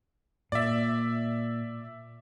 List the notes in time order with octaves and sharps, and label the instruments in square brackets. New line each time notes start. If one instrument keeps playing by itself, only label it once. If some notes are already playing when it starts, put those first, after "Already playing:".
[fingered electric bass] A#2 [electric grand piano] D5 E5